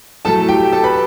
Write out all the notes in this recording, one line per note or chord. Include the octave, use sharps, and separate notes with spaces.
A2 F#3 A3 A4 A5
G4 G5
A4 A5
B4 B5